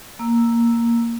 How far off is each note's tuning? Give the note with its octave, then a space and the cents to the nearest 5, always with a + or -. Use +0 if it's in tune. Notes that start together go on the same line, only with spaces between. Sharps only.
A#3 +0 E6 +0